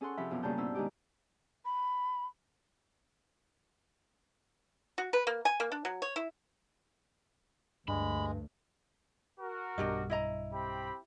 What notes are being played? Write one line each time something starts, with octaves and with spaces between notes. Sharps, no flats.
C#4 G#4 A4 F#5 C6 C#6
C3 F3 E5 B5
F#2 B2 F4
G2 C#3 A#3 F4 A5 G6
B2 C#4 E4 C5 E6
D#3 G#3 D#4 G4 D6
B5
F#4
B4
A#3
G#5
A#3
D4
F#3
C#5
E4
D2 G2 G#3 B5
F#4 A#4
B1 G2 D4 G4 D#5
E4 D#5 A#5
C4 G4 B5